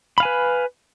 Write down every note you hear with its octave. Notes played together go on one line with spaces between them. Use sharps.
B4 F5 G#5 B5